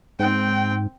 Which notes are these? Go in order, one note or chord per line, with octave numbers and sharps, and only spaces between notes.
G#2 C4 G5